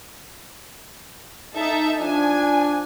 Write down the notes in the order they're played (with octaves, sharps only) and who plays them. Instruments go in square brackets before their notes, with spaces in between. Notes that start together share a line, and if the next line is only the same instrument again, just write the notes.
[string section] D#4 A4 E5
[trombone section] F3 D4 [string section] G#5